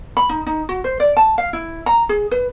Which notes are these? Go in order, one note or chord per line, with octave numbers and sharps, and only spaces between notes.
B5
D#4
D#4
F#4
C5
D5
A5
F5
E4
A#5
G#4
B4